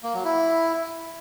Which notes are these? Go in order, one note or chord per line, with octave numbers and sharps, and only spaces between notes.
A#3
F#3
E4